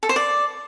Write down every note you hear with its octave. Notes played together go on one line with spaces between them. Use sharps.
A4
C5
D5